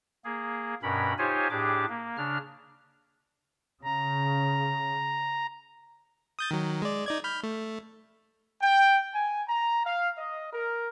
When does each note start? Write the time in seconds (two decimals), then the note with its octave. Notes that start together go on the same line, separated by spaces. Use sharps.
0.25 A#3 G#4
0.83 G2 B2 C#4 A#4 B5
1.18 D#4 F4 G4 C5 C#5 G#5
1.50 A2 D4 G4 G#4 D6
1.89 A#3
2.17 C#3 D4 F6
3.84 C#3 A#5
6.39 D#6 G6 A6
6.51 D#3 F#3
6.82 G#3 D5
7.06 D#4 D5 G#6
7.24 B5 F6 G6
7.43 A3
8.61 G5
9.14 G#5
9.47 A#5
9.85 F5
10.17 D#5
10.52 A#4